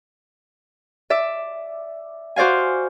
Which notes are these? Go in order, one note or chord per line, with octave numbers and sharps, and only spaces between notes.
D5 E5
F#4 C5 D5 F5 G#5